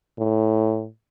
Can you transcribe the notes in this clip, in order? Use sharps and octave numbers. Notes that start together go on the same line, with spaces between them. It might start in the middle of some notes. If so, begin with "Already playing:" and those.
A2